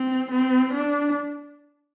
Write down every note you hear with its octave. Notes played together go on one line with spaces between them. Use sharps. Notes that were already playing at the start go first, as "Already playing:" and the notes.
Already playing: C4
C4
D4